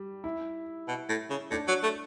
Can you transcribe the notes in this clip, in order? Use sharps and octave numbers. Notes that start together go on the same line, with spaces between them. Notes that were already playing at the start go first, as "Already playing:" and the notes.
Already playing: G3
E4
B2
A2
C#3
A2 D4
F#3
A3